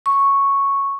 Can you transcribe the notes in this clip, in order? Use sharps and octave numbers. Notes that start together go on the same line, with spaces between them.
C#6